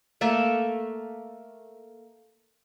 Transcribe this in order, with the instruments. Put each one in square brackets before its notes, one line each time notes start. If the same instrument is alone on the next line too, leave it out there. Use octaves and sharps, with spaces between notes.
[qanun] A3 A#3 A4 E5